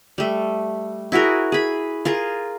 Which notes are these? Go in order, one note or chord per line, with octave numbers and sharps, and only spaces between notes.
G3 A3
E4 F#4 G#4 A#4
G#4 B5
F4 G#4 A#4